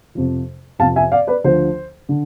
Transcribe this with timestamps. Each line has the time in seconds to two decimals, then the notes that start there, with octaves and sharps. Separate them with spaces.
0.15 F2 C3 F3
0.79 F2 C3 F3 F5 A5
0.96 E5 G#5
1.12 D5 F5
1.27 B4 D5
1.44 D2 D3 F3 C5
2.09 D3